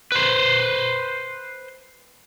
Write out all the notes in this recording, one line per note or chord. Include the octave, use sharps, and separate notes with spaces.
B4 C5